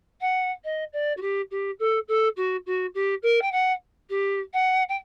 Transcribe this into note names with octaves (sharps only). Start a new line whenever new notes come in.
F#5
D#5
D5
F#4
G4
G4
A4
A4
F#4
F#4
G4
A#4
G5
F#5
G4
F#5
G5